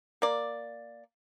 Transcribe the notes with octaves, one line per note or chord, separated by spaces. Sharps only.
A#3 D5